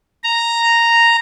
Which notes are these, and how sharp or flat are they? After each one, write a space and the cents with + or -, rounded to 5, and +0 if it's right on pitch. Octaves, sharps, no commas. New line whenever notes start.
A#5 -5